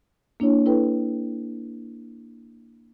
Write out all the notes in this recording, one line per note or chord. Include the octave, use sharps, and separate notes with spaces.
A#3 D4 E4 C#5
E4 A4 B4 G5